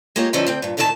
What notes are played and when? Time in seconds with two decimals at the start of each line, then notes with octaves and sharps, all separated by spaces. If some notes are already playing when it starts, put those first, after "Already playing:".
0.16 G#3 A#3 F4 G4 C#5
0.33 D3 E3 F3 B3 C#4 D#4
0.46 D2 C4 G5
0.62 G2 A#2
0.77 D2 A2 D#3 A3 A4 A5